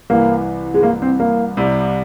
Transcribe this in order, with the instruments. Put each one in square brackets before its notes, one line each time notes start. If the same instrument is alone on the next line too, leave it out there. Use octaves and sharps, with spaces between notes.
[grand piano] C2 C3 E3 [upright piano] A#3
[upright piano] G#3
A#3
C4
A#3
[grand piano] C2 C3 G3